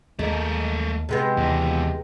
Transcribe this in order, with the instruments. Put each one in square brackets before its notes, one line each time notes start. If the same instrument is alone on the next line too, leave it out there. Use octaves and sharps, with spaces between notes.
[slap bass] D#2 F3 [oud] G#3 [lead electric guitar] A3 A#4
[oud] C3 G#3 B3
[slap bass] D#2 [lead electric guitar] B2 E3